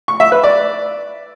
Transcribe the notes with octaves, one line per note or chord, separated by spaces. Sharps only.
C#6
E5
B4
D5